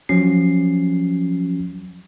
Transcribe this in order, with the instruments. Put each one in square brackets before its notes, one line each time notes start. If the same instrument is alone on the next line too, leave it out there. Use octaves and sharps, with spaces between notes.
[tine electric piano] F3 F#3 C#4 C7